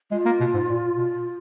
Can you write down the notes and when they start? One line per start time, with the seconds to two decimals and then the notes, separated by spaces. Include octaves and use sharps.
0.11 G#3 F4
0.26 A#3
0.40 B2
0.54 G#2
0.69 A#2
0.97 B2